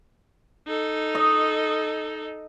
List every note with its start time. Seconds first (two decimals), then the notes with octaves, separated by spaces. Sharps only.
0.68 D#4 A4
1.15 D#5